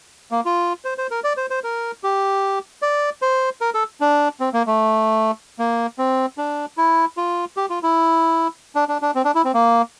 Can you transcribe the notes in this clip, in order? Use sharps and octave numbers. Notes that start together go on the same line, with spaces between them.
A#3
F4
C5
C5
A#4
D5
C5
C5
A#4
G4
D5
C5
A#4
A4
D4
C4
A#3
A3
A#3
C4
D4
E4
F4
G4
F4
E4
D4
D4
D4
C4
D4
E4
C4
A#3